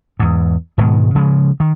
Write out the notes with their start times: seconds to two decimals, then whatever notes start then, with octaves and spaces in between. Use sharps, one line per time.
0.19 E2 G#2
0.78 G#2 B2 D#3 G#3
1.15 C#3 F3 G#3
1.60 D#3